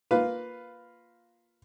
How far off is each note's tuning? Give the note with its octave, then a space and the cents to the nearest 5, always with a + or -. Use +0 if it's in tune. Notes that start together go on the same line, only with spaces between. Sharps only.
A#3 +0 F4 +5 B4 +5